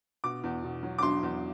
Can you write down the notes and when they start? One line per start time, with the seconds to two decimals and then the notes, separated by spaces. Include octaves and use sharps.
0.24 B2 D6
0.44 E2
0.64 B2
0.83 F#3
0.98 D6
1.03 F#3 C6
1.23 E2